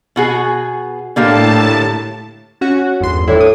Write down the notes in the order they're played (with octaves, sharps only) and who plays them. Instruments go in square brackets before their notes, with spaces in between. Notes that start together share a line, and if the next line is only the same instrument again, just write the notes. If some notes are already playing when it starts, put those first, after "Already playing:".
[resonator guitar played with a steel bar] B2 F#4 G#4
[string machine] A2 A5 [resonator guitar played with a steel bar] D3 A#3 G4
[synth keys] C#4 F#4
G1 E2 C6
[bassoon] A2 [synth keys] E3 D4 E4
[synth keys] D#6